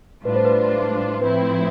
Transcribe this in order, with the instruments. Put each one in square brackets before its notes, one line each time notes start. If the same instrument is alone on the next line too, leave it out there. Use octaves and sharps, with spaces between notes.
[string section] A2 G3 D4 F4 [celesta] B4
[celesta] C5
B4
[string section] A2 F3 C4 E4 [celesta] B4